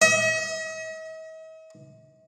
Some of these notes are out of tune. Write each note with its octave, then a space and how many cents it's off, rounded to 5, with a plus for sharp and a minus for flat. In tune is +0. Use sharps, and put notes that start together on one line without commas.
D#5 +45